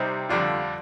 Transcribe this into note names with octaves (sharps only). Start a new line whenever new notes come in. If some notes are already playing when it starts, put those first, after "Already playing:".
Already playing: C3 G3 C4 D#4
F2 D3 G3 D4 F4